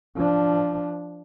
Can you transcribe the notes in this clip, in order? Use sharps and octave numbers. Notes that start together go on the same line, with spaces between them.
F3 D4